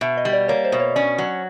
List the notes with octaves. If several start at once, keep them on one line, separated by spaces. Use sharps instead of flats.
B2 E5
D#5
G3
D5
A#3 C#5
C5
B2
C#5
C#4 D5
F#3